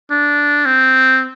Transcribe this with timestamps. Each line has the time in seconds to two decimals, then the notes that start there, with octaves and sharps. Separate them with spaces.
0.11 D4
0.66 C4